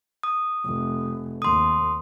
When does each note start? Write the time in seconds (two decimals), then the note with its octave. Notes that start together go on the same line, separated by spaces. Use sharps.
0.23 D#6
0.65 F1
1.42 D#2 C6 D#6